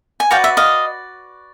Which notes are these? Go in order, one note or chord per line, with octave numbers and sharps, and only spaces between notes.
G#5
F#4 B4 D5 F5 G5
E5
D#5 F5